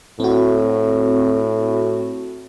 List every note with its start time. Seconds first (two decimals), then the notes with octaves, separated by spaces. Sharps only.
0.20 A2 C4 F#4